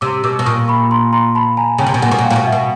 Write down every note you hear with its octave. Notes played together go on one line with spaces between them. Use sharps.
C3 D6 E6
B2 D6 E6
B2
A#2 C#6 D#6
B5 C#6
A#5 C6
A#5 C6
A5 B5
G#5 A#5
C#3 G5 A5
C3
B2
A#2 F#5 G#5
B2
A#2
F5 G5
A#2
B2
E5 F#5
B2